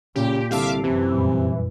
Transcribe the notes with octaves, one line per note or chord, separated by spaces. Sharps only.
A#2 C#3 G4
C2 D3 G4 E5 F5 A5 D6
F#2 C3 E3
F2 A#2 G3